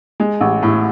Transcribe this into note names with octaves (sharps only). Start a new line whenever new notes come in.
G#3
A1
A2